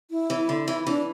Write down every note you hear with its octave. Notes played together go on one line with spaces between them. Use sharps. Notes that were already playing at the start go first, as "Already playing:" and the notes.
E4
E3
D3
E3
E3 D4